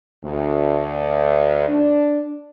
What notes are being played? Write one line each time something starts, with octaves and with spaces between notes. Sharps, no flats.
D2
D4